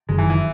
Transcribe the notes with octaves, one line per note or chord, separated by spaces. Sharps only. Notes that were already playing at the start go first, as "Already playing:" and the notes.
F#1 F#2 D#3 F#3 G#3
E3
E3